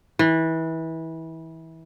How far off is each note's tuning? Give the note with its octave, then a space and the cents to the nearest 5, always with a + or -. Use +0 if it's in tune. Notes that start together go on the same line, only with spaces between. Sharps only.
E3 -25